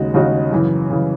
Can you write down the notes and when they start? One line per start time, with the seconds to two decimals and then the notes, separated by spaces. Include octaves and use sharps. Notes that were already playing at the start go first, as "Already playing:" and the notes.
Already playing: D#2 C#3 G#3 D#4 F#4
0.14 D#2 C#3 G#3 D#4 F#4
0.51 F#2 C#3 E3
0.90 C#3 E3